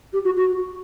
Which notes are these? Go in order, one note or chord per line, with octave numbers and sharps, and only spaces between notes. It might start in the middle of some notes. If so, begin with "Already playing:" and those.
G4
F#4
F#4